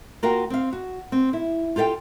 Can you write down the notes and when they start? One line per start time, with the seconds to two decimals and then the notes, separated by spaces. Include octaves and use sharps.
0.23 A#3 F4 F#4 A#4 F5 G5
0.50 C4 F5
0.73 F#4
1.12 C4
1.33 E4
1.76 F4 G4 A4 F5 G5